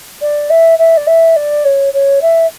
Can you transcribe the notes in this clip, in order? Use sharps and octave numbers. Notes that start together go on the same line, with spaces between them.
D5
E5
E5
D5
E5
D5
C#5
C#5
E5